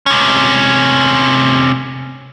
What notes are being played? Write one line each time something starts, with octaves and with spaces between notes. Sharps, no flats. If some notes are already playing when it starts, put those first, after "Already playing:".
C3 C#4